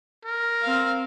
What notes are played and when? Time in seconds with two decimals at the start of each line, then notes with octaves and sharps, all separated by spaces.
0.25 A#4
0.63 C4 F5